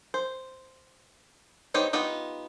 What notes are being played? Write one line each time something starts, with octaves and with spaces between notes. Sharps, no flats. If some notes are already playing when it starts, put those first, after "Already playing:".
C5
B3 D#4 G4 C5 C#5
B3 D#4 F4 G4